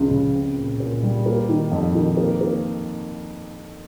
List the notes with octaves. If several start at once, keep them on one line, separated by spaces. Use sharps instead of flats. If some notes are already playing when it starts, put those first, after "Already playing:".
Already playing: C#2 C#3 F3
C#2
C4
A#2
A#2
G3
A#3
D#3
F2
D#3
A#3
A#3